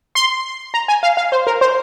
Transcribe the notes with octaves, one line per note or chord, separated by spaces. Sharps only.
C6
A#5
G#5
F5
F5
C5
A#4
C5